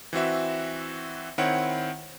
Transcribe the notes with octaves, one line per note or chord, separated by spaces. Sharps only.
E3 C4 F#4 E5
D#3 C4 E4 C#5 F#5